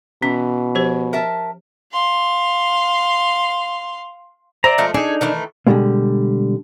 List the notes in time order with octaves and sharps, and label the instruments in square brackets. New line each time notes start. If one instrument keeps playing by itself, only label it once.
[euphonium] B2 [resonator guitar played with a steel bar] E3 [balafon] C#4
[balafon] F3 G4 C5
[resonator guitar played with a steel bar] A#4 E5 A5
[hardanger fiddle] F5 C6
[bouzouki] C5 [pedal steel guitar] D5 E5 A#5
[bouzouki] F3 G#3 A3
[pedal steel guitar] D4 D#4 [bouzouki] G#4 A4
[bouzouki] D#3 E3 A3
[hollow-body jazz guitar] B2 D3 D#3 G3 G#3 A#3